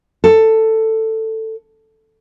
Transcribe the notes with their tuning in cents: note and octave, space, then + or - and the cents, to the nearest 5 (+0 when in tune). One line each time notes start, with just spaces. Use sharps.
A4 +10